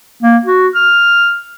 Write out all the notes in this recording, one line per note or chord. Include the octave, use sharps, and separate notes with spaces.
A#3
F#4
F6